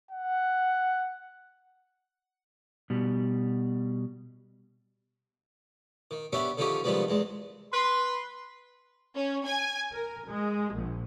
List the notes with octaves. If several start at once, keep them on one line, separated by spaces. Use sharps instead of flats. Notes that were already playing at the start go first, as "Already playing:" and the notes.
F#5
B2 G3
D#3
B3 C#4 D4 G4 E5
D3 D#3 F3 C#4 D#4 G4
C3 D#3 F3 G3 G#3 B3
E2 G#3
B4 C6
C#4
G#5
A#4
G#3
A#1